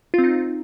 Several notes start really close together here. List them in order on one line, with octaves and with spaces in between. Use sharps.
F4 C4 D#4